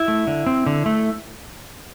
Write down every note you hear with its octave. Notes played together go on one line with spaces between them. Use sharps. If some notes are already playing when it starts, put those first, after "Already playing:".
Already playing: E4
A3
D3
C4
D3
A3